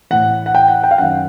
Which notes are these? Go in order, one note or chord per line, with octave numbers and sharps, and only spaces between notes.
A2 E3 F#5
F#5
G5
F#5
G5
F5
F#2 D#3 F#5